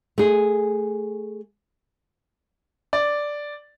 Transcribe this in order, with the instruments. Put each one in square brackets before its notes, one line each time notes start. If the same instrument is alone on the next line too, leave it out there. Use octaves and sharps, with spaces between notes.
[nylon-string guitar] A3 G#4
[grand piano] D5